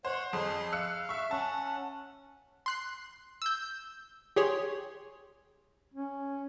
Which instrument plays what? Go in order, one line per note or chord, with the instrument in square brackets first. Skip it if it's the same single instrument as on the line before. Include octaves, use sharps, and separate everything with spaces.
[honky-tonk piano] C5 [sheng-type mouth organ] C#5 F#5
[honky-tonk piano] F2 [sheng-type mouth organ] G#4 C6
[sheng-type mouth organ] F5 [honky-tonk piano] E6 F#6 C#7
[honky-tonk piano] E5 C#6
[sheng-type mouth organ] C#4 F#5 [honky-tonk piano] A5
[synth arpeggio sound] C6 F#6 C7
E6 G6
G4 G#4 C#5 C6
[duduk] C#4